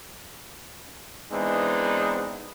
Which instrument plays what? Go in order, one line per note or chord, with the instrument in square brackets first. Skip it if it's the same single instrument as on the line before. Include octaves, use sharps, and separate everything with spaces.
[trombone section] E3 G#3 B3 C4 D4 D#4